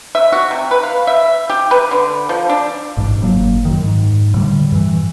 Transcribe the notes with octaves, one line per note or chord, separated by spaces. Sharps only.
E5
F#4
C3
B4
F5
E5
G4
B4
D3
F3
D4
A1 G#2
G1 F#3 A#3
F#2 D#3
G#2
A2 D3 G3
G2 E3